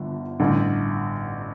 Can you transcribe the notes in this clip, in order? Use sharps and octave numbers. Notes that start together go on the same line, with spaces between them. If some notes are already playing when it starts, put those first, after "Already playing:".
Already playing: G1 G2 D3 F3
A1 G2 D3